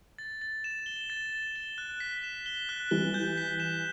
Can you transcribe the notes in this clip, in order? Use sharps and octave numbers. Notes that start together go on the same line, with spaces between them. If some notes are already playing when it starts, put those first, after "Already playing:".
A6
A6
E7
G7
A6
A6
G7
F#6
B6
E7
G7
F#6
E3 G3 G7
G6
B6
E7